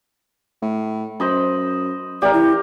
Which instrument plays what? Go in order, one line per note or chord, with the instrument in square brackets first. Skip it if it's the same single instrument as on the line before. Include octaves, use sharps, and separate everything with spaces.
[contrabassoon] A2
[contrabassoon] F#2 [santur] C5 D#5 B5
[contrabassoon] A1 [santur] G4 A#4 [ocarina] D5
[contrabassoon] E3 [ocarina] E4